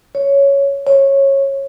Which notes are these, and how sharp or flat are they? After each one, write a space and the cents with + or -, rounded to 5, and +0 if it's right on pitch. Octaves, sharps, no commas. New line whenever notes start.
C#5 +5
C#5 -15